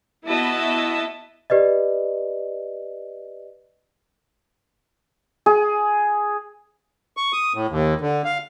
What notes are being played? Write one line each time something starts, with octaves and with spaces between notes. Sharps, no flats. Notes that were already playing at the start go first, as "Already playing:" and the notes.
B3 E4 F#4 D#5 E5 A5
G4 B4 D5 D#5
G#4
C#6
D#6
A2
D#2
D3
F5